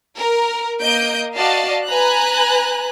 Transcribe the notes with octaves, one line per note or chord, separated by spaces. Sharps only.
A#4
A#3 D#5 G6 D7
F#4 D5 D#5 F5 A5
B4 G#5 A#5 F#6